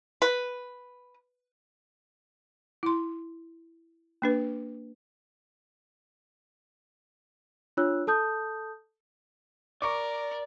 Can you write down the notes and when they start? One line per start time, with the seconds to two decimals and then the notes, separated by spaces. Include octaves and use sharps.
0.22 B4
2.83 E4 C6
4.22 A#3 D4 B4
7.77 D4 F4 C#5 E6 F#6
8.07 A4 A5 D#6 G6
9.82 A#4 D5 C#6 D6